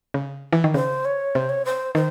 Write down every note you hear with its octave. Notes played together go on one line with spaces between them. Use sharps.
C#3
E3
D#3
C#3 C5
C#5
C3 C5
C#5
C5
D#3 C5